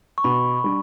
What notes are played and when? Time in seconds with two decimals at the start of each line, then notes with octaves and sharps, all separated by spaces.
0.18 C#6
0.24 B2 B5
0.64 G3 D4